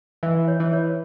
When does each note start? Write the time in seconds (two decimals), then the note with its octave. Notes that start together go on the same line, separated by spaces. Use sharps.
0.23 E3 E5
0.48 C#5
0.60 E3
0.73 C#5